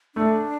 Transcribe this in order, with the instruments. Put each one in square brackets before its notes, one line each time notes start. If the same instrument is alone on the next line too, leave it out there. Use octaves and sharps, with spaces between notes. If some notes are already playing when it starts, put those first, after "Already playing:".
[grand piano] A3 [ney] D4